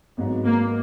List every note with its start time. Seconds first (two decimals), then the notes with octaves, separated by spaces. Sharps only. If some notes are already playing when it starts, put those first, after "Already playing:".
0.17 G#1 G#2 F#3 B3
0.46 A#3